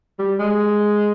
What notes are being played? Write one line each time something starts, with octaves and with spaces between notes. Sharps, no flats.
G3
G#3